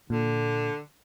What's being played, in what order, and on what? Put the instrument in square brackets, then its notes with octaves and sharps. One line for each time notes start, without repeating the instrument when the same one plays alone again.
[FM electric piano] A#2 [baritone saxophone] D3